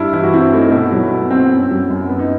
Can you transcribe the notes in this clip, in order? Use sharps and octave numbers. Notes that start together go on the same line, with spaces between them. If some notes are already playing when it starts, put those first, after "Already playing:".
Already playing: G2 E4
E3 E4
F#4
C4 E4
A3 D#4
B2 E4
F#3
B2
C4
F#2
F#3
F#2
B3
D#4